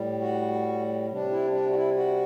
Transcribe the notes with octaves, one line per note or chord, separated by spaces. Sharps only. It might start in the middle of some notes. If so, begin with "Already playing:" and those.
Already playing: A2 G3
F#4
C3 G3 D4
E4
D4
F#4
E4
F#4